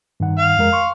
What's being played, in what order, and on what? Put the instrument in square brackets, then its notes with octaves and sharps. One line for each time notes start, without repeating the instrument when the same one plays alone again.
[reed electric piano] G2 D#3 F#5
[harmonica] F5
[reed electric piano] F2 G#3 A#4
C6 C#6